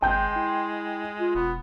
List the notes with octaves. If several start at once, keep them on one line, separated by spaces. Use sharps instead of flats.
G#1 G#3 G5 C6 G6
E4
F4
E1 B3